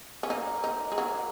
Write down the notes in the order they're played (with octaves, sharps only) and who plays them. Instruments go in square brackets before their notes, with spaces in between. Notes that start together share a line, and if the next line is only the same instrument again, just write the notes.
[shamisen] C#4
[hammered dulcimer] A#3 [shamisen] D#4
[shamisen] D#4
G#3
F#3